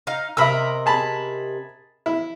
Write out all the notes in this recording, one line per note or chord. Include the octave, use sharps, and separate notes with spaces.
D#4 F5
C3 A#4 D#5 E5 B5 E6
G#4 A5 B5
E4